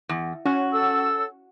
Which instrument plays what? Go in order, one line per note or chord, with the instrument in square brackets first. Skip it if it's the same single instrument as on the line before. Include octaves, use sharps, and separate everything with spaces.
[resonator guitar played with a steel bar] E2
[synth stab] C#4 [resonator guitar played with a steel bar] F#4
[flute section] A4 E6